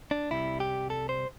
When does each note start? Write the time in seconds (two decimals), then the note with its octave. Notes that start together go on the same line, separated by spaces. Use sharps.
0.11 D4
0.31 C2 C3 G3 E4
0.60 G4
0.90 A4
1.09 C5